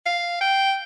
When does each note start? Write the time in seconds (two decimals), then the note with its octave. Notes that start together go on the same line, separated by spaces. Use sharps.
0.06 F5
0.41 G5